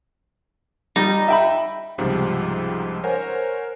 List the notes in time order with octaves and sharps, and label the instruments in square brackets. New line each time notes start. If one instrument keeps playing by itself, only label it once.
[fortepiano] G3 [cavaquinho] D#4
[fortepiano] E5 G5 B5
[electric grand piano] C#2 G#2 C3 F3 G3
A#4 C5 C#5 F#5 G#5